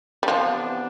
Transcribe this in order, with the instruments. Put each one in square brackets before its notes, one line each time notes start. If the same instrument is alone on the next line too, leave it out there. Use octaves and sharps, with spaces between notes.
[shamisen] G3
[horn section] C3 E3 B3 D4 [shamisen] F3